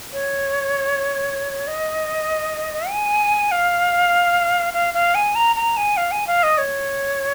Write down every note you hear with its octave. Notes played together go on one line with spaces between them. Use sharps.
C#5
D#5
G#5
F5
F5
F5
G#5
A#5
A#5
G#5
F5
G#5
F5
D#5
C#5